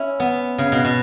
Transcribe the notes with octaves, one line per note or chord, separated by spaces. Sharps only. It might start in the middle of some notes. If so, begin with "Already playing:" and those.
Already playing: C#4 E4
B3
C#3
B2
B2